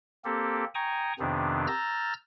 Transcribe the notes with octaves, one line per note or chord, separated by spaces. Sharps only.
A#3 C4 G4 A4
G5 G#5 A#5 C#6 D#6
F2 C3 D#3 B3 C4 D4
A#5 E6 F6 G6 A6 A#6